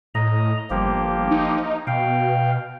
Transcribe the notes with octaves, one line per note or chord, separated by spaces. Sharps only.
A2 D#5 A#5
G1 F3 A#3 G4
D#4
B2 F5 G5